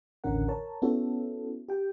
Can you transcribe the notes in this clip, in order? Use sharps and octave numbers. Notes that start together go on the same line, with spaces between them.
A1 D#2 D3 C#4 A#4 F#5
A#4 C#5 A5
B3 C#4 E4 F#4 A4
G4 G5